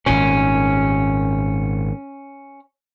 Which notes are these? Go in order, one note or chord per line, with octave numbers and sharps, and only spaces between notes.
G#1 A#2 C#4